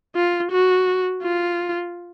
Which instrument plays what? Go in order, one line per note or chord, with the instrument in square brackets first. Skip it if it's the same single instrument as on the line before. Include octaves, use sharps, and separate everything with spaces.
[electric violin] F4
F#4
F4